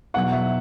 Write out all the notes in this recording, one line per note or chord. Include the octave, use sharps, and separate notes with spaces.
E2 B2 F#3 F#5
E5